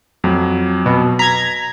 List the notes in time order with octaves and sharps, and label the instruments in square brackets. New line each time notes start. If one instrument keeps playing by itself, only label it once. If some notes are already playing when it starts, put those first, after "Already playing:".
[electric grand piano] F2 F#3
[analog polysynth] B2
[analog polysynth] A#5 G#6 [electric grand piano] B6